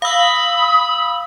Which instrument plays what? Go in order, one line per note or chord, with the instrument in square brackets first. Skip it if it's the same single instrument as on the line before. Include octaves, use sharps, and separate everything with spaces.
[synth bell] F5 E6 [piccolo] B5 [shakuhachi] D#6